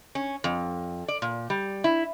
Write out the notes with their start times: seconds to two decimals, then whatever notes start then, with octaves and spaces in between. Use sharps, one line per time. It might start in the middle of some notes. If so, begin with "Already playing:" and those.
0.15 C#4
0.44 F2
1.08 D5
1.22 A#2
1.50 G3
1.84 E4